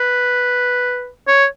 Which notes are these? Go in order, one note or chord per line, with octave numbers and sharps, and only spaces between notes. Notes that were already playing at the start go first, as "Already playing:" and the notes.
Already playing: B4
C#5